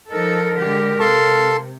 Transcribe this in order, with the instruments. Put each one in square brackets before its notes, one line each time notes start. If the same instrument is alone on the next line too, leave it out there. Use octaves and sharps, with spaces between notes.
[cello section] F3 D#4 A4 [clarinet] A#4
[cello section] D3 G#3 G4
[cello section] C3 [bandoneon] A4 A5 [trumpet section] F5 C6